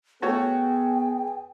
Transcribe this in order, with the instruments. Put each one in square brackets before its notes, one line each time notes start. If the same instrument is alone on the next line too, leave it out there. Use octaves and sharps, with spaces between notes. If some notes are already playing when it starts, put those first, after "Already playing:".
[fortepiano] A3 F#4 C#5 [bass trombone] B3 [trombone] G#4 [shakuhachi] G5